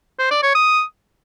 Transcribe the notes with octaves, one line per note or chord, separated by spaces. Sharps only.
C5
D5
C#5
D#6